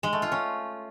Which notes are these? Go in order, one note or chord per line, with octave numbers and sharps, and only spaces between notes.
G#3
A3
F4
C#4